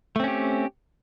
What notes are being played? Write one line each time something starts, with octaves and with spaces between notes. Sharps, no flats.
A3 C4 C#4 G4